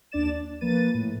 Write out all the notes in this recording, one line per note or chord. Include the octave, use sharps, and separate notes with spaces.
D#2 D4 D5 A6 E7
D4
F3 A#3 B4 A6 D#7
A2